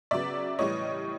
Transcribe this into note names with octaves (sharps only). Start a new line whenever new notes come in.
C#3 F#3 B3 D5 E5
A2 E3 G3 C#5 D#5